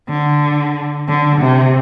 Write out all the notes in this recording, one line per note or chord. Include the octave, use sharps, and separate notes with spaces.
D3
D3
C3